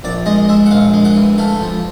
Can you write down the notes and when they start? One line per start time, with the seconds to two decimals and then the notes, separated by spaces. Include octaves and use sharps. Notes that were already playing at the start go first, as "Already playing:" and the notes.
0.04 A#1 D5
0.26 G#3 D#5
0.49 G#3 E5
0.66 F#5
0.71 A#1 F5
0.94 G#3
1.05 F#5
1.16 E3
1.38 A3 F5
1.61 F3